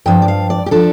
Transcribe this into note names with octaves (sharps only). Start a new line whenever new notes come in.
G2 F3 D4 G5
D5
F5
D5
G4
F3 D4 A4